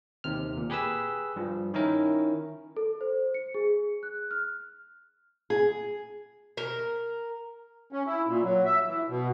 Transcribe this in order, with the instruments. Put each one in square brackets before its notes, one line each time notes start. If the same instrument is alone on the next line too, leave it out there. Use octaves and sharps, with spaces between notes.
[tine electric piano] D#2 C3 F6
A#2
G4 G#4 B4 B5 E6
G2 F3
D#3 C#4 D#4 E4 A#4
[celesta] A4
C5
C#7
G#4
F#6
F6
[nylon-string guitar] G#4
[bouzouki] A#4
[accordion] C#4
E4
A#2
F#3
E5
E3
B2